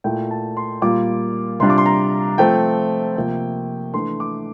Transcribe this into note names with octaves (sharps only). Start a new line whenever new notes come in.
A#2 A3 E4 G5
A5
C6
A#2 G3 A#3 F4 D6
C3 G3 D4 F4 C6
D6
C6
A#5
F3 A3 C4 G5
C3 F3 A#3
E3 A3 D4 C6
D6